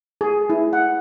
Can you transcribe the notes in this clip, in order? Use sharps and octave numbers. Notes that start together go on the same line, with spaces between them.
G#4
E4
F#5